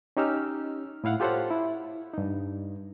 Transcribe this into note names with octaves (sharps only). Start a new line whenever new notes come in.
C#4 D#4 G4 E6 F6
A2 E4 F5 F#5
F4 G4 A4 C5 C#5 F#5
E4
G2 D#4